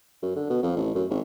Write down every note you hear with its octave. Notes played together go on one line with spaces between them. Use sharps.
F#2
D3
B2
F2
A1
F#2
G#1